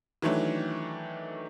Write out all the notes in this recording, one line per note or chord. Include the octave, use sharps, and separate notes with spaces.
D#3 E3 F#3 A3 D4